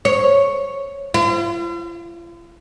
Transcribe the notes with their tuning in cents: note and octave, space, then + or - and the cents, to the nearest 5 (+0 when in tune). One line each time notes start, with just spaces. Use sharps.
C#5 +0
F4 -45